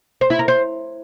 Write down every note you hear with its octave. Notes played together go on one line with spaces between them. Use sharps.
C5
E4
A#4
C5